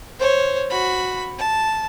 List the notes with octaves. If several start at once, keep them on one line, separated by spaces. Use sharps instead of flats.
C5 C#5
F#4 B5
A5